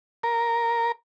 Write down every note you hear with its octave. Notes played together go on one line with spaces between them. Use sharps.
A#4